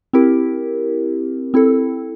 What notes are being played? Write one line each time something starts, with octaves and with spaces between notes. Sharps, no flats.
C4 E4 G4 A#4
C4 E4 A4